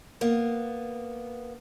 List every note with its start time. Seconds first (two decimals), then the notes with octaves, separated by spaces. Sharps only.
0.21 A#3 B3